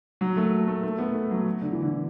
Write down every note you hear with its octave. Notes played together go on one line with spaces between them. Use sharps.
F#3
A3
A3
A3
B3
A3
F#3
D3
E3
D3